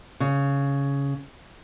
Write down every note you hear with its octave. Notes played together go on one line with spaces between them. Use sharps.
C#3